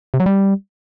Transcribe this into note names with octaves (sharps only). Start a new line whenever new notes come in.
C3
F#3
G3